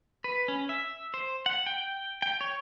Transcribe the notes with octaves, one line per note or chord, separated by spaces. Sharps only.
B4
C#4
E5
C5
F#5
G5
G5
C#5